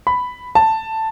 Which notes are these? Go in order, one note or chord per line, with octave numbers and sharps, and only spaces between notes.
B5
A5